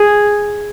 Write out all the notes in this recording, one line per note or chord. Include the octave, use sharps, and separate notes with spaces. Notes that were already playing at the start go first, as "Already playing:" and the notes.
Already playing: G#4